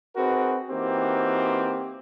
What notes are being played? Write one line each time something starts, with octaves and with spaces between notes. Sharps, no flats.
C4 D#4 F#4 G#4 A#4 B4
E3 A#3 C4 D#4 F#4 G4